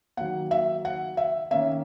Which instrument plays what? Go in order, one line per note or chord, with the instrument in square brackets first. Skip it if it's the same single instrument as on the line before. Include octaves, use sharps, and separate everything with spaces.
[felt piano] D#3 F#3 A#3 F#5
E5
F#5
E5
D#3 A#3 C#4 E5